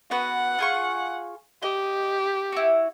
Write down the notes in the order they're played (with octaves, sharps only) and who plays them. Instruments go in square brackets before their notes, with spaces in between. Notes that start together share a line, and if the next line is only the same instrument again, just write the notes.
[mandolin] B3 F#4 B4 [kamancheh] F#5
[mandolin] F4 G#4 C#6
[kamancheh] G4 [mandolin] D#5
[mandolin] E4 F#4